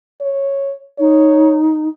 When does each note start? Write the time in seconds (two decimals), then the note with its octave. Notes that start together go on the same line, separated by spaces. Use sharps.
0.21 C#5
0.99 D#4 C#5